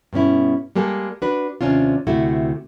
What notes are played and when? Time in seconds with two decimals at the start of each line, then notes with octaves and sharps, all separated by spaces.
0.13 G2 B2 C#4 E4
0.76 G3 G#3 A#3 G4 A4
1.22 D4 F#4 B4
1.61 D#2 C3 C#4 D4 F4
2.07 D2 C3 A3 E4 F#4